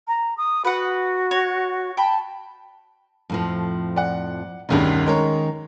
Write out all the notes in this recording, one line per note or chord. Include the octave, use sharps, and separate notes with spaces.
A#5
D#6
F#4 B4 F#5
C#5
G5 A5 B5
F2 A2 F3
D5 F#5
E1 D2 G2 D#3 C#4 D#4
G#3 A#4 C#5